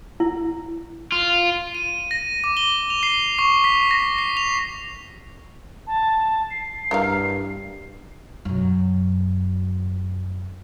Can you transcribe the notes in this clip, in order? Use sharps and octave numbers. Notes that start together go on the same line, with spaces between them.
E4
F4
D#7
A#6
D6
G7
F7
C7
C#6
B6
A#6
C7
F7
A5
C7
G2 E4 A#4 F5
F#2 B2